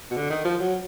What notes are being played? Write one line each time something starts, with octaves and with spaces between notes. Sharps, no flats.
B2
D3
D#3
F3
F#3